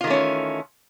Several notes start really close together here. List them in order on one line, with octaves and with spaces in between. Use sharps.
F4 D#3 A3 C#4 E3